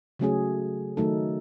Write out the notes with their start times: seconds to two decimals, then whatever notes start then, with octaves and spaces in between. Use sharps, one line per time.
0.19 C#3 F#3 A3 C#4 G#4
0.97 D#3 F#3 A3 D#4 A4